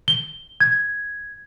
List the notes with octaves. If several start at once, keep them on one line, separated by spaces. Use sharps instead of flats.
G7
G#6